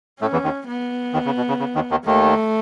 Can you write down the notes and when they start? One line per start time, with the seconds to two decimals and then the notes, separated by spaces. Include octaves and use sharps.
0.21 A2 A3 C#4
0.32 E2 E3
0.44 D#2 D#3
0.68 B3
1.14 D#2 D#3
1.26 C#3
1.37 B2
1.49 C#3
1.60 C#3
1.75 D#2 D#3
1.91 D#2 D#3
2.06 D#2 D#3 A3